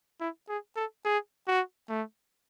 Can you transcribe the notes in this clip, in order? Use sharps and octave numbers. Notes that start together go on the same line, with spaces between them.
E4
G#4
A4
G#4
F#4
A3